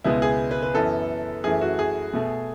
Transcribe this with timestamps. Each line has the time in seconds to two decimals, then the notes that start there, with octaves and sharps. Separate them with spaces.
0.04 C#2 B2 G#3 B3 E4
0.22 G#4
0.51 B4
0.63 B4
0.74 F#2 E3 B3 A4
1.44 F#2 E3 A3 G#4
1.61 F#4
1.79 G#4
2.14 B2 A3